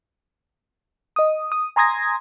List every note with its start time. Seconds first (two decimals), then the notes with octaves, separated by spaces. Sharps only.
1.16 D#5 D#6
1.52 D#6
1.76 G#5 A#5 C6 D#6 G#6 A#6